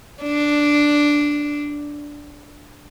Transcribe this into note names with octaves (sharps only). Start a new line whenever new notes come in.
D4